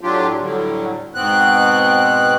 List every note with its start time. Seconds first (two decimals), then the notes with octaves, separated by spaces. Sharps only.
0.01 A2 F#3 D4 F4 G4
0.41 A2 D3 F#3 G3
1.15 G#2 B2 B3 C4 F#6